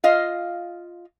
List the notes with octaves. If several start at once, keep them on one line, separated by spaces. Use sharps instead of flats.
F4 D#5 F5